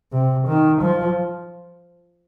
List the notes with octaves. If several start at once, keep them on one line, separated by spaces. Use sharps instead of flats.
C3
D#3
F3